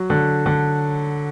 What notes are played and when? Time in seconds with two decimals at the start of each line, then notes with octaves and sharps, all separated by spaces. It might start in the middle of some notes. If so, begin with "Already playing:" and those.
Already playing: F#3
0.10 D3
0.46 D3